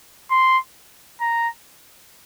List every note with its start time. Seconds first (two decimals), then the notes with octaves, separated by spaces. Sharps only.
0.31 C6
1.21 A#5